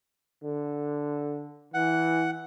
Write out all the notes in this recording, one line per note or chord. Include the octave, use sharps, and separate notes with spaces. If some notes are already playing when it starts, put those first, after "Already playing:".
D3
E3 F#5